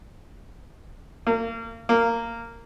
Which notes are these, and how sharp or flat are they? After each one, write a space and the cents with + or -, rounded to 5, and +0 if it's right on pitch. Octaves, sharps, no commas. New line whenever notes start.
A#3 -35
A#3 -15